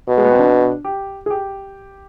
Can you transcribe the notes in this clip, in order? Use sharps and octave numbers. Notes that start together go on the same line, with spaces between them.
B2
G#3
B3
C4
D4
G4
G#4
G4